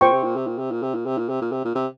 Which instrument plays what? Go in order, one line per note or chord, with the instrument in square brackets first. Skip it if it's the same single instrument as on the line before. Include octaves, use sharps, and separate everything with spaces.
[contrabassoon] A#2 [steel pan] C5 G5 C#6
[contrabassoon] C3
A#2
C3
A#2
C3
A#2
C3
A#2
C3
A#2
C3
A#2
C3
A#2
C3